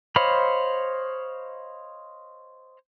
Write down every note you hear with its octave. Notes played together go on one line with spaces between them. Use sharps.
C5 C#5 D#5 F5 B5